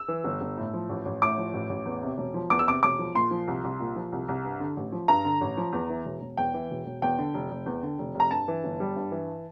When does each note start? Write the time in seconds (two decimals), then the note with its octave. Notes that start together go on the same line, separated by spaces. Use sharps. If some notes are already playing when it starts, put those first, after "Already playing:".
Already playing: E6
0.08 E3
0.24 G1
0.41 G1
0.57 A2
0.74 F3
0.89 A1
1.05 A1
1.22 A2 D6
1.38 F3
1.53 A1
1.69 A1
1.86 E2
2.03 C3
2.18 E1
2.34 F3
2.50 E2 D6
2.59 E6
2.67 C3 D6
2.83 E1 D6
2.99 F3
3.15 A#2 C6
3.31 F3
3.48 C2
3.64 C2
3.79 A#2
3.96 F3
4.12 C2
4.28 C2
4.45 G2
4.60 D3
4.77 A1
4.92 F3
5.08 G2 A#5
5.25 D3
5.41 A1
5.57 F3
5.73 E2
5.90 E3
6.05 E1
6.21 E1
6.37 E2 G5
6.54 E3
6.71 E1
6.86 E1
7.02 E2 G5
7.18 D3
7.34 F1
7.51 F1
7.66 E2
7.83 D3
7.99 F1
8.15 F1
8.20 A#5
8.31 G2 A5
8.48 E3
8.64 G1
8.80 G3
8.96 G2
9.11 E3